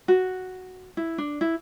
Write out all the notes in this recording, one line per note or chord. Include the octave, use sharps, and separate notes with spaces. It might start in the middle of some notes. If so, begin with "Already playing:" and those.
F#4
E4
D4
E4